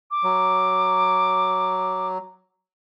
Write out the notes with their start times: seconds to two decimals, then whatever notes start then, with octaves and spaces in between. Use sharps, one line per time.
0.11 D6
0.24 F#3